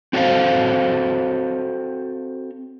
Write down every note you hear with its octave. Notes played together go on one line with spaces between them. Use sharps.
C4 F#4 A4 A#4 C5 F5